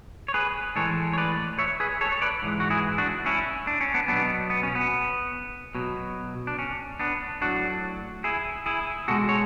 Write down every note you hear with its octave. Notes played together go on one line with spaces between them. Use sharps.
C#5
G#4 B4
A2 E3 G#3 A4 C#5
C#5
B4 D5
C#5 E5
G#4 B4
A4 C#5
C#5
B4 D5
G#2 E3 G#3
F#4
E4 G#4
D4 F#4
C#4 E4
D4
C#4
B3 D4
B2 F#3 B3 D4
B3
C#4
B3
B2 F#3
D4
C#4
B3 D4
A2 F#3 D4 F#4
E4 G#4
E4 G#4
B2 G#3 F#4 A4
C#5